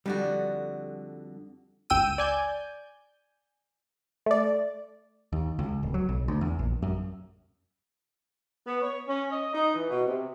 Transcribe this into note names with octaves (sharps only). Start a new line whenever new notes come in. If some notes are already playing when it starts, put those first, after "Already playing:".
F2 D3 G3 F#4
G1 C#2 G5 E6 D#7
D5 G#5 G6
A3 D5
D#2
C#2
D1
F#3
B1
D2
E2
A#1
F#2
B3
C#5
C#4
D#5
D#4
E3
B2
C3